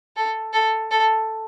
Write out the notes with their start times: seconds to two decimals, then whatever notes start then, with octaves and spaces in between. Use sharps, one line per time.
0.16 A4
0.53 A4
0.91 A4